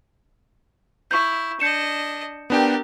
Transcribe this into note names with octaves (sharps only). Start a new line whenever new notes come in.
E4 C#6 G6
D4 D#5 G6 C#7 E7
B3 D4 G4 A#4 G5